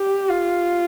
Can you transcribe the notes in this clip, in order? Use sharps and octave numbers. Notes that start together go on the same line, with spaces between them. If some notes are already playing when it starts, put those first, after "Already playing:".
Already playing: G4
F4